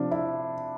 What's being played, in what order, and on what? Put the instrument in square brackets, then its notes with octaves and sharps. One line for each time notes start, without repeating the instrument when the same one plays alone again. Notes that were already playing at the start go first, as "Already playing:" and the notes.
Already playing: [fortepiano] C3 F3 [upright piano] D4
[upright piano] E4